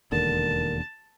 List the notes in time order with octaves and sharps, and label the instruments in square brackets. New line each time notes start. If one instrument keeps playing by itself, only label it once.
[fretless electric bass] E1 D#2 D3 [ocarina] A#4 [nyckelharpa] A5